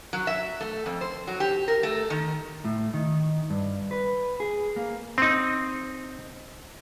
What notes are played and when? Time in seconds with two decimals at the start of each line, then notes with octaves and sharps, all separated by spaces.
0.13 F#3
0.27 E5
0.61 A3
0.86 F2
1.01 C5
1.27 F#3
1.40 G4
1.68 A#4
1.83 A3
2.10 D#3
2.65 A2
2.94 D#3
3.50 G2
3.91 B4
4.40 G#4
4.76 A#3
5.18 C4 D#4